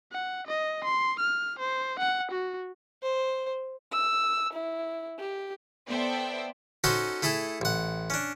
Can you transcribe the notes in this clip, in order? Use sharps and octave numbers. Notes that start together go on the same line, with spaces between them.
F#5
D#5
C6
F6
C5
F#5
F#4
C5
E6
E4
G4
B3 A4 C5 D5 E5 G5
C#4 D#4 F#4 A4 C5
A3 E4 G#4 A4
A1 F#5
C#4 D4